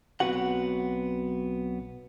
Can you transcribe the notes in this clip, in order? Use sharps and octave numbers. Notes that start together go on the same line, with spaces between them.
B1 D#3 B3 C4 F#4 F#5